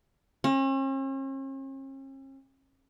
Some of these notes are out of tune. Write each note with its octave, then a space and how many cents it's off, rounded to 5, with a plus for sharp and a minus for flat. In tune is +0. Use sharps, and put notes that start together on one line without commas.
C#4 -45